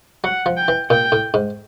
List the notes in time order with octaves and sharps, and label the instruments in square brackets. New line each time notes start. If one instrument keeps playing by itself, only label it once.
[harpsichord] F#3 [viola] F#5
[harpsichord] F3
[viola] G5
[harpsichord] E3
[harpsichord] A#2 [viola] G5
[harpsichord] A2
G#2